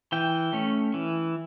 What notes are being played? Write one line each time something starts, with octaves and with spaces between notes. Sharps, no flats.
E3 G5
A3 C#4
E3